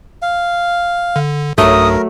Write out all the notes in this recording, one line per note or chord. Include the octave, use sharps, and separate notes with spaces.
F5
D3
B1 G2 F#3 A3 A#4 D#6